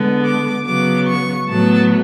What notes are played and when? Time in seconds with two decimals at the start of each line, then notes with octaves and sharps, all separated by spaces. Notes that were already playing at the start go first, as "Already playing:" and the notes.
Already playing: D3 G#3 B3
0.24 D6
0.65 C#3 F#3 B3 D6
1.06 C#6
1.47 A2 F#3 B3 A5